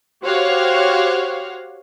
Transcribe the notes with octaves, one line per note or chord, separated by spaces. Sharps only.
F#4 G4 C5 C#5 F5 F#5